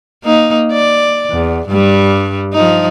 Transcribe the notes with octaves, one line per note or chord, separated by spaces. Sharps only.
A#3 D#4
D5
E2
G2 G3
F3 D#4